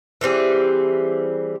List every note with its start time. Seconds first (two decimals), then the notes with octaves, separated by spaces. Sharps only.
0.21 E3 G3 C4 G#4